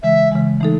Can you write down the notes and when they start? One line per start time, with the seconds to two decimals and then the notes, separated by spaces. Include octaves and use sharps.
0.03 C#3 E3 G#3 E5
0.32 C#3 E3 G#3
0.60 E3 A3 D#4 A4